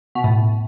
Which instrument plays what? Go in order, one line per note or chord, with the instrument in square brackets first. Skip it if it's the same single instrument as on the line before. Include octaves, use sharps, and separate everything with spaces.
[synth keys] B2
A2